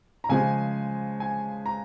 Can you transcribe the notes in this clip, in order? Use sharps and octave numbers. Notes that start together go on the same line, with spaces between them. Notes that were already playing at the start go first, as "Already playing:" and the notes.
A#5
C#3 F3 G#3 G#5
G#5
A#5